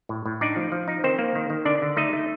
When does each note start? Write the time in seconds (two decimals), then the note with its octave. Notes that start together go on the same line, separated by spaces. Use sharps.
0.09 A2
0.26 A2
0.41 D4 D#4 D5
0.56 F3
0.72 F3
0.88 D#4
1.04 D#3 C4 C5
1.19 A#3
1.35 D#3
1.50 D#3
1.65 D3 D4 D5
1.82 D3
1.97 A3 D#4 D#5
2.13 A3